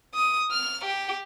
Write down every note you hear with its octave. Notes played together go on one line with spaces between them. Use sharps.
D#6
F6
G4